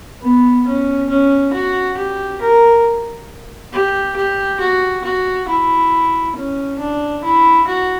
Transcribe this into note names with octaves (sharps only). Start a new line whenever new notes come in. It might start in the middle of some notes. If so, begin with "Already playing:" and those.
B3
C#4
C#4
F#4
G4
A#4
G4
G4
F#4
F#4
E4
C#4
D4
E4
F#4